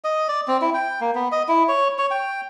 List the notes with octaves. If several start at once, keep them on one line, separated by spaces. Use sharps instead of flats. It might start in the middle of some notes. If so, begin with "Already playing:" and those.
D#5
D5
C4
E4
G5
A#3
B3
D#5
E4
C#5
C#5
G5